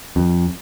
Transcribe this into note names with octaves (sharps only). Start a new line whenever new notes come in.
F2